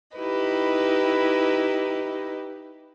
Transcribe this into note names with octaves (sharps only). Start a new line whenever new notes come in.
D#4 E4 G4 B4 D#5